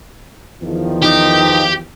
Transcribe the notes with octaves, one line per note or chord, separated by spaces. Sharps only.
E2 D#3 F3
D#4 G4